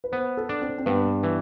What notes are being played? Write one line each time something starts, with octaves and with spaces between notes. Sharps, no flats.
B4
B3 C5
A4
D4
C4
C4
G2 B3
E3